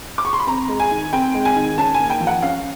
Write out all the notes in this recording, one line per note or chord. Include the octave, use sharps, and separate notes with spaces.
D6
C#6
C6
B5
C4 A#5
G#3
G#5
D#3
C4 G5
G#3
G#5
D#3
C#4 A5
G#5
A#3
G5
F3
F#5
C#4 F5